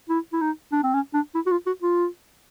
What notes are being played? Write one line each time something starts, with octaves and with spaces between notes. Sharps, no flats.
E4
E4
D#4
D4
C4
C#4
D4
E4
F#4
F4
F#4
F4